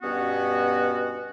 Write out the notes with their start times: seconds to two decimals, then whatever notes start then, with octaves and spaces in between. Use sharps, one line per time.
0.03 G2 B2 B3 C#4 F#4